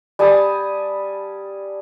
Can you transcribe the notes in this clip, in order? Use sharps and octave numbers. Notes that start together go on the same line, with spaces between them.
G3 G#5 A5 D#6